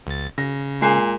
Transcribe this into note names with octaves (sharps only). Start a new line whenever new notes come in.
C#2 A6
C#3 A#6
A#2 G#3 G#5 C7